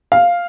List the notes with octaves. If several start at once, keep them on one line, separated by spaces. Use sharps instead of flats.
F5